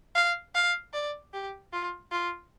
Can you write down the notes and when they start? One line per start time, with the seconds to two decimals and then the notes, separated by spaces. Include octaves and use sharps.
0.15 F5
0.55 F5
0.93 D5
1.34 G4
1.73 F4
2.11 F4